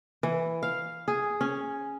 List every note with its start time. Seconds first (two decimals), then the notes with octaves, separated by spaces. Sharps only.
0.23 E3
0.63 F5
1.08 G#4
1.41 C#4